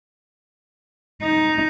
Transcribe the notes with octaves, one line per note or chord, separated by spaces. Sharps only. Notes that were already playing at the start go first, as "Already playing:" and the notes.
D#4